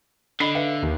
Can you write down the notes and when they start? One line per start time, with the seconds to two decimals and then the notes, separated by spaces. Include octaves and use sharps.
0.40 D3 D#5 B5 C7
0.55 B4 E5 F5
0.83 D#2 D#4